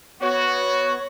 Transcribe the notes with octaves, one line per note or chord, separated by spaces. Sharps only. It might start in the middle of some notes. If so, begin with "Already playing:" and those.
B3 F#4 C#5